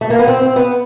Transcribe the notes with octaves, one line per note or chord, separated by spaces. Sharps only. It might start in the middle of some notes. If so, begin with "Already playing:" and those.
A3
A#3
B3
C4
C4
B3